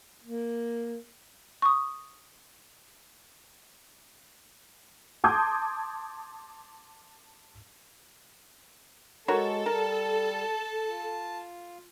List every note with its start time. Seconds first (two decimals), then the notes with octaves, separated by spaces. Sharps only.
0.23 A#3
1.62 C#6 D#6
5.24 A5 C6 D6 D#6 G6 G#6
9.28 G#3 F#4 A4 A#4 C#5
9.66 G3 A#4 A5
10.87 F4